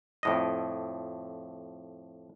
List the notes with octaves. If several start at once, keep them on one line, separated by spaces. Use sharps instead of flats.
F2 A2 D#5